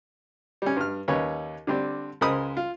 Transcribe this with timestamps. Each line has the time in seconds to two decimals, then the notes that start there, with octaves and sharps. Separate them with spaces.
0.62 G3 C#4
0.77 G2 F6
1.08 D#2 C#4 B4 C#5
1.67 D3 G3 C4 D4
2.21 C#2 G#3 A#4 C5 B5 D#6
2.57 F4